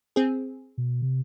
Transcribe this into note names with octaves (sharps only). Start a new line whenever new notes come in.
C4 G#4
B2
C3